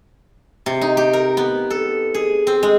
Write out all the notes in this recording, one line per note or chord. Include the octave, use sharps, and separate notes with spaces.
C3
D#4
G4
A#4
B3
A4
G#4
C4
G#3